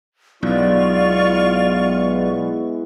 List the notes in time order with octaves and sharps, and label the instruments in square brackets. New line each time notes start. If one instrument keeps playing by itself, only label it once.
[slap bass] B1 [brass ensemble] G#3 B3 E4 [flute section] F4 D5 C#6